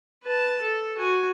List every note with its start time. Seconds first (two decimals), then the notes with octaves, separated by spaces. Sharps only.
0.24 B4 A5
0.62 A4
0.98 F#4 G#5